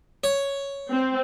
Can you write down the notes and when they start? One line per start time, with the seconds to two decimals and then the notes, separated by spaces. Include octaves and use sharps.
0.24 C#5
0.90 C4